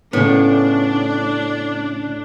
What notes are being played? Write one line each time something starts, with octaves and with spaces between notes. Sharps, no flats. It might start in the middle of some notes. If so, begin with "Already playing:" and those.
A2 C#3 B3 D4